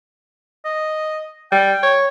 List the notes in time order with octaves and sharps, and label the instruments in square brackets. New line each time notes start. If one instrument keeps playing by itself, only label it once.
[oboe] D#5
[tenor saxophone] G3 [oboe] G5
[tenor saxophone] C#5